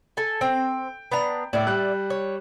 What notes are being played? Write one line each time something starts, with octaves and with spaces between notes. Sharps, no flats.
A4 G#5
C4 G5
B3 D4 A#5
A2 D5 E5
G3 F#6
C#5